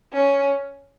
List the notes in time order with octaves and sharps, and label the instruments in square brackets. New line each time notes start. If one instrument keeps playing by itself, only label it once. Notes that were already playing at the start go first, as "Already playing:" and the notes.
[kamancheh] C#4